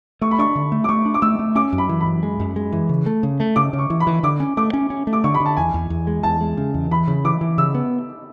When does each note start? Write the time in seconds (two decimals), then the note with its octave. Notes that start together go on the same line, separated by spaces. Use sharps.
0.21 A3 C#6
0.31 B5
0.39 D4 C#6
0.55 D3
0.72 A3
0.84 D6
0.89 A3 C#6
1.05 D4
1.14 D6
1.22 A3 E6
1.39 A3
1.55 C#4 D6
1.72 F#2
1.78 B5
1.89 E3
2.01 B5
2.06 F#2
2.23 G#3
2.40 F#2
2.56 G#3
2.72 E3
2.89 C#3
3.06 A3
3.23 C#3
3.40 A3
3.56 C#3 D6
3.73 C#3
3.78 C#6
3.90 E3
4.00 B5
4.07 E3
4.23 D3 D6
4.40 C#4
4.57 A3 D6
4.73 C#4
4.90 C#4
5.07 A3
5.13 D6
5.24 D3 C#6
5.35 B5
5.40 D3
5.46 A5
5.57 E2 G#5
5.74 E2
5.90 E2
6.07 G#3
6.23 E2 A5
6.41 G#3
6.57 C#3
6.74 E2
6.91 E3 B5
7.08 C#3
7.25 E3 D6
7.41 E3
7.58 C#3 E6
7.75 B3